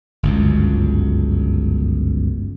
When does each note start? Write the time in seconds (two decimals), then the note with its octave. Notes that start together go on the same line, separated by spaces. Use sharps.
0.23 G1 C#2 F#2